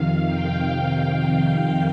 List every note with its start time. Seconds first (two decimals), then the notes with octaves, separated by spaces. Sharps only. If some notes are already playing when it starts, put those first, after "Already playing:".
Already playing: F2 C3 D#3 F5
0.27 G5